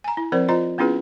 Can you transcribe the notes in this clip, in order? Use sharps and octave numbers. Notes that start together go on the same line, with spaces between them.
G#5 A#5
E4
F3 C4 A#4 C5 D5
F4 C5 D#5 A#5
B3 C#4 E4 F4 G#4 B4